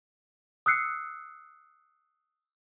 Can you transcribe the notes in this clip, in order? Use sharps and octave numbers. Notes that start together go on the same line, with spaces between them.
D#6 E6 F#6 C7 C#7